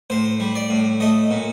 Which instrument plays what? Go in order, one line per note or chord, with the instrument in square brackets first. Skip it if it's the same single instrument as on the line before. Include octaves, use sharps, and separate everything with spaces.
[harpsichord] A2 C5
G3
D5
A2
A3 D#5
A#2